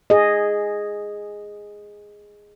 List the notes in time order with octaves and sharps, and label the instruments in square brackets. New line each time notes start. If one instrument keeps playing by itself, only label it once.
[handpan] G#4 D#5